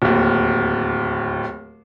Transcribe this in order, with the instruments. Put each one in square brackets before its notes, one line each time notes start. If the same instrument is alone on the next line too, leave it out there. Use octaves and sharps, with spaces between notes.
[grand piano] D1 D#2